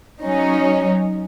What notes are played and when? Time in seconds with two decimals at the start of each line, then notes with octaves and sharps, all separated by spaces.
0.22 F#3 C#4 D#4